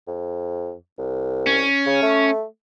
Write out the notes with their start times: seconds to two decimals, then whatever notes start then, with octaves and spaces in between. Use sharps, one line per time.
0.07 F2
0.98 C2
1.47 C#4
1.86 C#3
2.02 A3